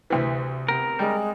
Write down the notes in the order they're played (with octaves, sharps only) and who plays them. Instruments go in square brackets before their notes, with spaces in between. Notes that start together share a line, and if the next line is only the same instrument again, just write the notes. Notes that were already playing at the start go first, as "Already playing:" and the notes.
[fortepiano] D2 E3 [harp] C3 B6
[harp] B3 C4 G4 [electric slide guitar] A#4
[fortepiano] G3 [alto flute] G#3